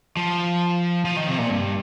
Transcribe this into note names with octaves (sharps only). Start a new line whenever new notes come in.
F3
F3
D#3
C3
A#2
G2